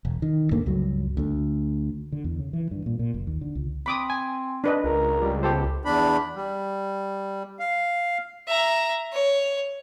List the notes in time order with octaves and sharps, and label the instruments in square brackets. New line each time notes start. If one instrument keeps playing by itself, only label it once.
[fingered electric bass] E1
D#3
D2 G2 A3 A#3
C#2 G2 F#3
D2 A3
[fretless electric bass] D3
E2
C#3
E3
G2
A#2
A#2
F#1
D#2
D3
C#2
[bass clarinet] C4 [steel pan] B5 D6 D#6
[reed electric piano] G#5
[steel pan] D4 B4 D#5
[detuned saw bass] C#2 [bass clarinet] A#4
[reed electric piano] G3
[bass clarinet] B3 [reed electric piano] G4 A4 C5
[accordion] E2 D4 B5
G3
F5
[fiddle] E5 A#5
C#5